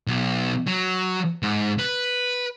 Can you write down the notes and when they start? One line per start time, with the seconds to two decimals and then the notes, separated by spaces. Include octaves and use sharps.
0.07 B1
0.68 F#3
1.43 G#2
1.79 B4